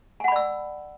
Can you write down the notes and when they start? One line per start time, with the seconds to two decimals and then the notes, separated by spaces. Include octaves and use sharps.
0.20 G#5
0.24 F#5
0.28 B5
0.32 D5
0.36 E6